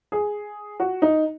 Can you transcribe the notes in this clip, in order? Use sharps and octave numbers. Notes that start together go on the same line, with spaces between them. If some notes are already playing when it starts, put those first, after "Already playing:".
G#4
F#4
D#4